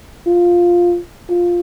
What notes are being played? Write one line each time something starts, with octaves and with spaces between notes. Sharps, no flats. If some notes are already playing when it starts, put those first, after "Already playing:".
F4
F4